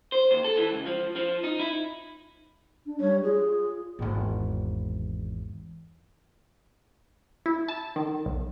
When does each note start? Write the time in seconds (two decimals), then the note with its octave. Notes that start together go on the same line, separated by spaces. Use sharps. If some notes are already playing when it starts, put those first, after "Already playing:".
0.12 C5
0.31 D#2
0.44 A4
0.57 E3
0.71 C#2
0.86 F3
1.16 F3
1.44 D#4
1.59 E4
2.86 D4
3.00 G3 C#5
3.23 F4 G#4
3.99 G#1 E2
7.46 E4
7.68 A5
7.96 D#3
8.26 B1